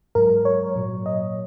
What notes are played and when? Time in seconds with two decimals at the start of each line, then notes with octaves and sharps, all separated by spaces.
0.15 G#2 F#3 A#4
0.45 C#5
0.76 A#2 F#3
1.06 D#5